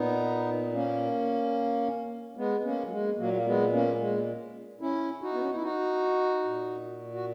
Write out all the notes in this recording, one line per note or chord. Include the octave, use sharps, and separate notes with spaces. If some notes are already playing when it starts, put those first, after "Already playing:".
Already playing: A#2 B3 D#4
A#3 C#4
G#3 B3
A#3 C#4
F#3
G#3
A#2 F#3 A#3
A#3
G#3 B3
A#3 C#4
G#3
C#4 E4
D#4 F#4
B3
C#4
D#4
E4
D#4 F#4
A#2
F#4